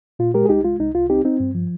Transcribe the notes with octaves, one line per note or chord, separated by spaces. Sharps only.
A#2 F4
G#3 G4 A#4
G#4
C2 D#4 G4
G#3 F4
C2 D#4
C2 F4
C4 D#4 G4
C4 D#4
G2
F3